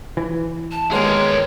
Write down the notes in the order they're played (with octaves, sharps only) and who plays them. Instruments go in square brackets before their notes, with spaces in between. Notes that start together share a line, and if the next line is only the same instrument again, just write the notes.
[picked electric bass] E3
[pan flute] A5
[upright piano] D#2 G#3 B3 [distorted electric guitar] G#4 A#4 [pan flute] C#5